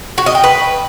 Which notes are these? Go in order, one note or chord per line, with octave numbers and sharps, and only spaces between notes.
F#4
D#5
G5
B4